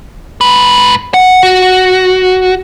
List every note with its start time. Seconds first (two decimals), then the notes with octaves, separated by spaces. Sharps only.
0.41 G#2 B4
1.14 F#5
1.43 F#4